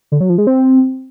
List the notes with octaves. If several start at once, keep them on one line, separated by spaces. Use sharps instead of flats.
D3
F#3
F3
G#3
C4